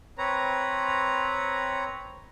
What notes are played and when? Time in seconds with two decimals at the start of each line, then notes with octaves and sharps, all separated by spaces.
0.18 C4 B4 C#5 A#5